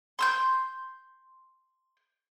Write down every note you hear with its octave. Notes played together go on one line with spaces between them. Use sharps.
C6 E6 G6